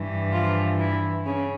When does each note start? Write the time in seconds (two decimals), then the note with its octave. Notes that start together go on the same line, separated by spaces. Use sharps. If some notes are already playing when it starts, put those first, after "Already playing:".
Already playing: G2 E3
0.32 F3 F4
0.79 E3 E4
1.25 C#3 C#4